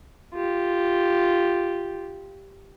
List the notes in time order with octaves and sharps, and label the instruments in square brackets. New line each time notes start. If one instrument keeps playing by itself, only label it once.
[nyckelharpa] F4 G4